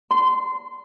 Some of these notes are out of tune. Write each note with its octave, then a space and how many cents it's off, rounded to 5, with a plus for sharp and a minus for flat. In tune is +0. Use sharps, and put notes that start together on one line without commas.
C6 -20